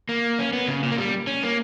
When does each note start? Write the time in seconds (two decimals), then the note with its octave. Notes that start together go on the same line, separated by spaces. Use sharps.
0.09 A#3
0.39 C#4
0.53 B3
0.68 C#3
0.83 A#2
0.92 A#3
0.98 G3
1.27 C#4
1.43 A#3